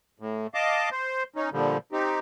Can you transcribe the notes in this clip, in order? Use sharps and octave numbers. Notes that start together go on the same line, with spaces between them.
A2
D#5 F5 A5 D6
C5
C#4 D#4
A#2 D3 F3 G3
C4 D#4 G4